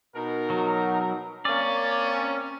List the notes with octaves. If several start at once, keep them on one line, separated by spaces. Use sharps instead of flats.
B2 D#4 A#4
F#3
A#3 C4 C#4 D5